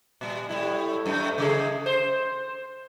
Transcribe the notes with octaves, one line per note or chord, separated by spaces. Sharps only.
A#2 G3
A2 G3 E4
F#2 A3
C#3 A3 G#4
C5